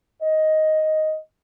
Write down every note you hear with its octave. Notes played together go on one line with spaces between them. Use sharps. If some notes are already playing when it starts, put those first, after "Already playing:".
D#5